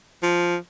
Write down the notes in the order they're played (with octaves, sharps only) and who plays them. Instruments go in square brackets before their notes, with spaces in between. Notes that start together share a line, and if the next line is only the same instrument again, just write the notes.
[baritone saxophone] F3